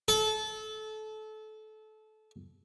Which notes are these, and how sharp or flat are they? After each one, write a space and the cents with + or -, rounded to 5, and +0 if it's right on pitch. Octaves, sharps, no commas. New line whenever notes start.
A4 -25